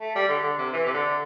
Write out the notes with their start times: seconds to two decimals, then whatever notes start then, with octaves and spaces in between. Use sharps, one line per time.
0.01 A3
0.15 G3
0.29 D3
0.43 D3
0.58 C3
0.73 E3
0.86 C3
0.94 D3